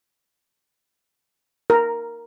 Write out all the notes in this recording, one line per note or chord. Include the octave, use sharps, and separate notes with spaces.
A#4